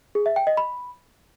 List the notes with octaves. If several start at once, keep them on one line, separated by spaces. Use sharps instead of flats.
G#4
E5
G5
D#5
B5